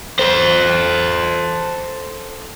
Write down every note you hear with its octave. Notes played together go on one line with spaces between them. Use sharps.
A4 C5